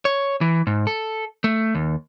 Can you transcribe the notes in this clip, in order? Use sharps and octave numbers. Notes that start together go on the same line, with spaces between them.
C#5
E3
G#2
A4
A3
D#2